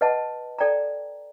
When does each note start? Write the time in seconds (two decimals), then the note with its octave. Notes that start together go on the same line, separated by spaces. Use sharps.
0.01 B4 D#5 F#5 A5
0.59 A4 D5 G5 A#5